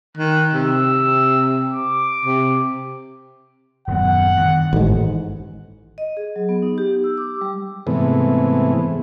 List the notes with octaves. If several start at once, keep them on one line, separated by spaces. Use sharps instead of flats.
D#3 F#6
C3 E6
D6
C3
D#1 F#2 B3 F#5
G2 D#3
A1 G#2
D#5
G#4
F#3
B3
D#4
G4
E6
D6
G3
G#2 C3 E3 A3 B3